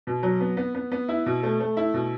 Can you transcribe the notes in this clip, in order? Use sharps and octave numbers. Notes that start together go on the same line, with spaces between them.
B2
F#3
B3
B3
B3
B3
E4
B2
A3
A3
E4
B2